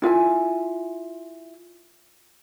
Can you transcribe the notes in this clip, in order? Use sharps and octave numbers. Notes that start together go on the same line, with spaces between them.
E4 F4 E5 G#5